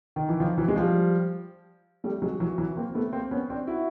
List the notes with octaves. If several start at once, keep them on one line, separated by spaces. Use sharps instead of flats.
D#3
E3
D#3 F3
E3 F#3
G#3
F3 G3
G3 A3
F#3 G#3
E3 F#3
E3 F#3
A#3 C4
A3 B3
A#3 C4
B3 C#4
C4 D4
E4 F#4